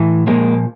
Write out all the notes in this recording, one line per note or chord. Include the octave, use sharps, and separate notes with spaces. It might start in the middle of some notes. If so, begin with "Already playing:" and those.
Already playing: A2 E3
A#2 F3 G#3 A#3